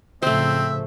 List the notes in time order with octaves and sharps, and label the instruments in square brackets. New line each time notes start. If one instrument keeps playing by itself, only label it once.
[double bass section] A2 C#3 F3 [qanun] A3 C5 [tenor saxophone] C4 [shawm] E5